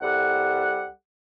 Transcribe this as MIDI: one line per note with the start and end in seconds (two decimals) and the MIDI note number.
0.01 0.88 36
0.01 0.88 55
0.01 0.88 69
0.01 0.88 78